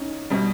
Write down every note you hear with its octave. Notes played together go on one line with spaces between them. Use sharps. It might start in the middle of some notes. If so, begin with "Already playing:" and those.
Already playing: C#4 D#4
B2 G3